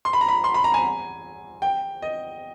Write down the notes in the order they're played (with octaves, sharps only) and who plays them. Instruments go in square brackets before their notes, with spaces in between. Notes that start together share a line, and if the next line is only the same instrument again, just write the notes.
[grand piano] C6
B5
A#5
B5
C6
B5
A#5
G#5
G5
D#5